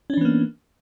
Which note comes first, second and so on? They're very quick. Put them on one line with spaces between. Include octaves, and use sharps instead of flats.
C#4 D4 E3 B3 A#3